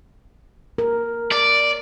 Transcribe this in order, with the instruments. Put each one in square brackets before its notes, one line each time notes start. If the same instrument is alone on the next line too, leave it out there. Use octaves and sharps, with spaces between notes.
[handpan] A#4
[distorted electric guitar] D5